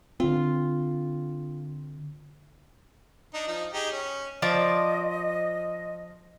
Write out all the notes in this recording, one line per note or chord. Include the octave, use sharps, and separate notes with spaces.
D3 C4 F4
D4 D#4
F3 D#4
D#4 G4 G#4
C#4
F3 C5 D5 D#5